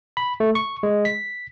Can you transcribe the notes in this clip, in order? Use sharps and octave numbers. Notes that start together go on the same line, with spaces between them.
B5
A3
C#6
G#3
B6